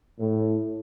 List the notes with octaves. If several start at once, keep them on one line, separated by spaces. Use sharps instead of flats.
A2